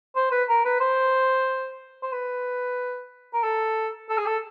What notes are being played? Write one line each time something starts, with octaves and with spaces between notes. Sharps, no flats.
C5
B4
A#4
B4
C5
C5
B4
A#4
A4
A4
G#4
A4